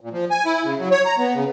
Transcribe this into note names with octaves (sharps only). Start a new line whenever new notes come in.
A#2
F3
G#5
E4
C#3
F#3
C#5
A#5
B3
C#3